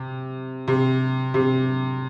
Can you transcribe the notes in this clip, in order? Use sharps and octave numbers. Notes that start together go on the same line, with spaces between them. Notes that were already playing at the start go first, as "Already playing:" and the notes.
Already playing: C3
C3
C3